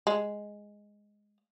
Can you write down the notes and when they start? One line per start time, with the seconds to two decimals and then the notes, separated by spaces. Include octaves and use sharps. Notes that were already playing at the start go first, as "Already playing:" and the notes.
0.07 G#3